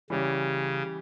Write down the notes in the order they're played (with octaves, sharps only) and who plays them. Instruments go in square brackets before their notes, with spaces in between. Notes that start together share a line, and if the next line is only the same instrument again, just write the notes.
[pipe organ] C#3 [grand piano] E3 G3 C#4 G4